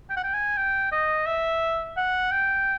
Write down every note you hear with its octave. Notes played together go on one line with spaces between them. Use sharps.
G5
F#5
G5
G#5
G5
D#5
E5
F#5
G5